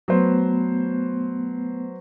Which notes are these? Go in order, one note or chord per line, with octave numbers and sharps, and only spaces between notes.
F#3 A3 B3 B4 C5